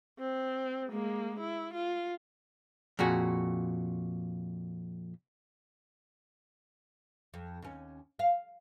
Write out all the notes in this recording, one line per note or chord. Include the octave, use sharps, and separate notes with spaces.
C4
G#3 A#3
E4
F4
F2 A#2 F#4 G#4
F2
D#2 C#4
F5